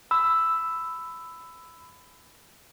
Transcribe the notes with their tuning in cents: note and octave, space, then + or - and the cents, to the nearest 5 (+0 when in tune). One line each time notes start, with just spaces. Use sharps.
B5 +20 E6 +0